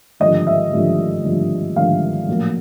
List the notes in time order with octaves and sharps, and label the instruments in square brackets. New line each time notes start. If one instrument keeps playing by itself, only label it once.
[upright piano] G#1 G2 D3 F3 A3 D#5
E5
G#1 G2 D3 F3 A3
G#1 G2 D3 F3 A3
G#1 G2 D3 F3 A3 F5
A#1 A2 F#3 A#3